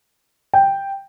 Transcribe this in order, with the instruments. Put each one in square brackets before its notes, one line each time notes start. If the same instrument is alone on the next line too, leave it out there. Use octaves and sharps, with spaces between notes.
[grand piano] G5